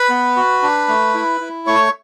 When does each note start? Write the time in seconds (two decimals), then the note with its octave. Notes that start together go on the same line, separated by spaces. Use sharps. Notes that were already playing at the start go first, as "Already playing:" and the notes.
Already playing: B4 B5
0.10 B3
0.36 F#4
0.63 D4
0.88 A3
1.14 E4
1.41 E4
1.66 A3 C#5 C#6